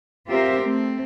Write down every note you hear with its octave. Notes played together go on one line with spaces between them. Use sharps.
C4 F4 G4 A#4 C5 E5
A3 C4